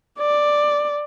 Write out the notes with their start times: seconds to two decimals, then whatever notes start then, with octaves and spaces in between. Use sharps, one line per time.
0.19 D5